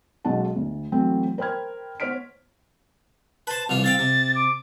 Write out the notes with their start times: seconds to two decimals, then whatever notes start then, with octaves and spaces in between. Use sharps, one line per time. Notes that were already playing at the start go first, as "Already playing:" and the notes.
0.25 B1 B2 G#3 C#4 F#5 A5
0.56 D2
0.92 E3 F#3 A3 C4 E4 F#4
1.38 A#4 C5 G5 B5 F6 G#6
2.00 B3 C5 C#5 F6 B6 D7
3.47 B4 C5 A5
3.69 C2 E3 F4 F7
3.84 C4 F5 G5 A6
3.99 C3
4.35 D6